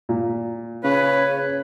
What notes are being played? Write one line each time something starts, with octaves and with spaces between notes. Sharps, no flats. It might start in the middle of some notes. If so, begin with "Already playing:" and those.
A#2
C#3 B4 C#5